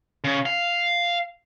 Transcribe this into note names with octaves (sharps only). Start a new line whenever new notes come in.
C#3
F5